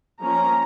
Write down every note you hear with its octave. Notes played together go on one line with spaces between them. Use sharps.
F3 A#3 C#4 A#5